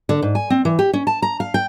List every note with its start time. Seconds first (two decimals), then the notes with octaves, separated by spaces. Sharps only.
0.09 D3
0.22 G#2
0.35 G#5
0.50 C4
0.65 E3
0.79 G4
0.93 C#4
1.07 A5
1.22 A#5
1.40 F5
1.54 G5